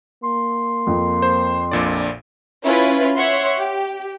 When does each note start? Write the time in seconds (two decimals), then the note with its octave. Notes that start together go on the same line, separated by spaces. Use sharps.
0.24 A#3 C6
0.87 F2
1.22 C5
1.72 A#1 A#2 D4 D5
2.63 C#4 E4 F4 B4
3.14 C#5 E5 F#5 C6
3.57 G4